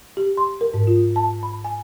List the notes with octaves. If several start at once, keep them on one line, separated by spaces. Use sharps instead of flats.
G4
C6
A#4
G#2
F4
A5
B5
G#5